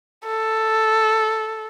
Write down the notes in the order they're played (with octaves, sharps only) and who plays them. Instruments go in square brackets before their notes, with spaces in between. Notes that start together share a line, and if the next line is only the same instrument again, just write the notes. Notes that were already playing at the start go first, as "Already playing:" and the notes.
[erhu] A4